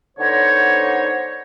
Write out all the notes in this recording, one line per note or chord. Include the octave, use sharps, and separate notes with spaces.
D3 B3 D#4 C5 C#5